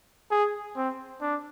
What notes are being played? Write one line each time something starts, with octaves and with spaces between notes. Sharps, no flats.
G#4
C4
D4